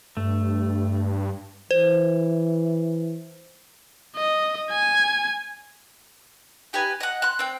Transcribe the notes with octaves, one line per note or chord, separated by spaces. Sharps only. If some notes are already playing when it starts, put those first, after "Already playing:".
G2 A3
E3 C5
D#5
G#5
D#4 G4 B4 G#5
D#5 F#5
C6 F#6
C4 G5